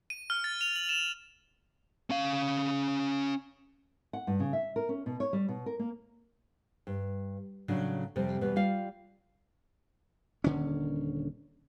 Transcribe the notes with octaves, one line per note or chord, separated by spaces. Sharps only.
D#7
F6
A6
F7
F#7
E7
C#4 F5
F#5
G2
C#3
E5
A#4
C#4
B2
C#5
G3
B2
A#4
A#3
G2
A2 C#3 F#3 D4
F2 C3 G3
E2 B2 G3 B4
G3 F4 F5
D#1 D3 C#4